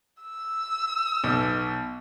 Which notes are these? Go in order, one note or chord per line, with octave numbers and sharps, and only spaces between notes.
E6
B1